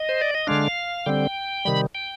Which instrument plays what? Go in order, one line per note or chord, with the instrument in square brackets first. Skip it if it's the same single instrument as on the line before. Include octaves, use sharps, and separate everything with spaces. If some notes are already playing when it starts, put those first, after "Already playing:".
Already playing: [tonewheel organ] D#5
C5
D5
D#5
D3 G#3 D4 F5
D3 G3 C4 G5
C3 D#3 G3 B5
G5